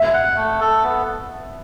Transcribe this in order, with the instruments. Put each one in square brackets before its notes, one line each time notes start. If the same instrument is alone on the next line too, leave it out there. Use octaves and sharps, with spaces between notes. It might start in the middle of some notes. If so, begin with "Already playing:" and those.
Already playing: [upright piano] E5
[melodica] F#5
A3
A4
B3